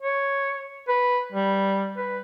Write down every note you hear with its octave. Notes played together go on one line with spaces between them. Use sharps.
C#5
B4
G3
B4